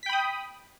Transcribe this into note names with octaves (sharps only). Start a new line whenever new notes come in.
G5 B5 D#6 B6